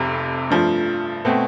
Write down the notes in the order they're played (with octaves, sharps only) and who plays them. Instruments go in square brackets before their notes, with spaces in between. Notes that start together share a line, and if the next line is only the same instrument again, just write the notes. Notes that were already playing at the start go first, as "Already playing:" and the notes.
Already playing: [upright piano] F1 F2 C3
G2 F3 A3
B2 A3 C4